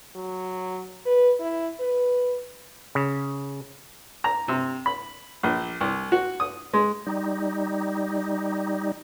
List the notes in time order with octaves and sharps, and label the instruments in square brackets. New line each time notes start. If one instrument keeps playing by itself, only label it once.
[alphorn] F#3
B4
E4
B4
[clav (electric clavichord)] C#3
[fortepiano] A#5
C3
B5
A#1
C2
F#4
D#6
G#3
[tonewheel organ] G3 D#4